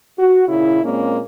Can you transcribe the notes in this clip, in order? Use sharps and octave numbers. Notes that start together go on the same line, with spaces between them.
F#4
A#2 C#3 E4
A#2 G#3 A#3 C4 C#4